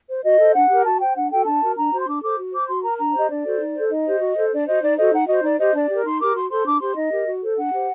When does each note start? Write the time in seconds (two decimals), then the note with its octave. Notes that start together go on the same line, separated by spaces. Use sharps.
0.08 C5
0.24 F#4 D#5
0.39 A4 C5
0.54 D4 F#5
0.70 G4 A#4
0.85 F#4 A5
1.00 C5 G5
1.16 D4 F#5
1.31 F#4 A4 G5
1.46 D4 A5
1.61 F#4 A#4
1.76 D4 A#5
1.92 F#4 C5
1.99 C6
2.07 D4 D6
2.22 A4 C5 D6
2.38 F#4
2.53 C5 D6
2.68 F#4 C6
2.83 A#4 A#5
2.98 D4 A#5
3.14 G4 C5 D#5
3.29 D4 D5
3.45 F#4 A4 C5
3.59 D#4
3.75 A4 C5
3.90 D#4 D#5
4.06 G4 C5
4.21 F#4
4.36 A4 C5
4.52 D4 D5
4.67 F#4 C5 D#5
4.82 D#4 D5
4.98 F#4 A4 C5 D#5
5.13 D#4 F#5
5.27 F#4 C5 D#5
5.43 D#4 D5
5.59 G4 C5 D#5
5.73 D4 D5
5.89 G4 A#4
6.04 D#4 C6
6.20 G4 A#4 D6
6.35 F#4 C6
6.50 A4 C5 C6
6.65 D4 D6
6.81 G4 C5 C6
6.96 D#4 D#5
7.12 G4 A#4
7.26 F#4
7.42 A4 C5
7.57 D4 F#5
7.72 G4 C5